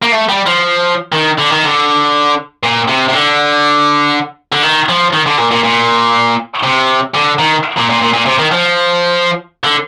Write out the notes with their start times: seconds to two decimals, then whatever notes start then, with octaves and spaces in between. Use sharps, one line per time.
0.02 A#3
0.12 A3
0.29 G3
0.47 F3
1.12 D#3
1.38 D3
1.50 D#3
1.64 D3
2.63 A#2
2.88 C3
3.09 C3
3.13 D3
4.52 D3
4.63 D#3
4.89 F3
5.13 D#3
5.26 D3
5.38 A#2
5.51 A#2
5.63 A#2
6.64 C3
7.15 D3
7.39 D#3
7.77 A#2
7.90 A#2
8.01 A#2
8.14 A#2
8.26 C3
8.39 D#3
8.51 F3
9.64 D3